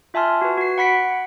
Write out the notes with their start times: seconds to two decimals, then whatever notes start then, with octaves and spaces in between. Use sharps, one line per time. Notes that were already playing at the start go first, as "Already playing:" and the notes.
0.14 F4 E5 G#5 A5 C6 F6
0.42 F#4 B4
0.58 F#4 C7
0.78 F#5 B5 B6 C#7 D7